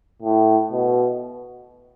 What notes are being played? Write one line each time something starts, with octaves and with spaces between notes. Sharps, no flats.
A2
B2